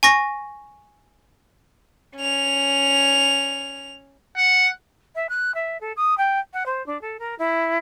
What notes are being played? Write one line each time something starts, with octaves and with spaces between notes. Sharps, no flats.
G#5 C#6 A#6
C#4 F7
F#5
E5
F#6
E5
A4
D#6
G5
F#5
C5
D4
A4
A#4
E4